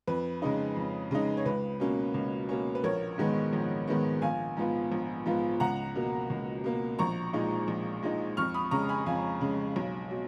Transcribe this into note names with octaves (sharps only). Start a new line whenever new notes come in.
F2 B4
C#3 G#3 D#4
F2
C#3 G#3 D#4
C#5
C#2 B4
B2 A#3 C#4
C#2
B2 A#3 C#4
B4
A#1 A#4 C#5
G#2 D#3 G#3 B3
A#1
G#2 D#3 G#3 B3
A#1 F5 G#5
G#2 F3 B3 F4
A#1
G#2 F3 B3 F4
C#2 F#5 A#5
B2 A#3
C#2
B2 A#3
A#1 A#5 C#6
A#2 G#3 D#4
A#1
A#2 G#3 D#4
F2 C#6 F6
B5 D#6
C#3 G#3 A#5 C#6
G#5 B5
F2 F5 G#5
C#3 G#3
B1
B2